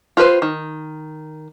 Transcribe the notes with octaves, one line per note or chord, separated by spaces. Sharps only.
F4 G4 B4 C5
D#3